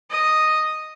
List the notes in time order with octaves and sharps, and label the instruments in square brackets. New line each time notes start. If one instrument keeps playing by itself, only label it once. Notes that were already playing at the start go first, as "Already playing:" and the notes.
[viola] D#5